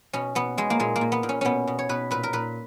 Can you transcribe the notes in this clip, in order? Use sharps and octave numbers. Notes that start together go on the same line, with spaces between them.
B2 C#4
B2 B3
B2 G#3
A#3
A#2 G#3
A#3
A#2
B3
A#2
C#4
B2 B3 C#4
B2
C#5
B2 B4
A#2 B4
A#4
A#2 B4